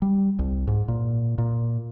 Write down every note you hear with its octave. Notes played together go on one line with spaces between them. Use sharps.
G3
C2
G#2
A#2
A#2